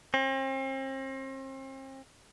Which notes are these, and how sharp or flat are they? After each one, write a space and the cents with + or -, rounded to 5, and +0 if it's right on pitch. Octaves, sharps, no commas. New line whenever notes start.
C4 +40